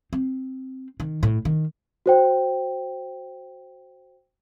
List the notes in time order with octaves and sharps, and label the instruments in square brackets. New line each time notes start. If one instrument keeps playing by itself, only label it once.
[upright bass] C4
D#3
A2
D#3
[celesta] F#4 C5 G5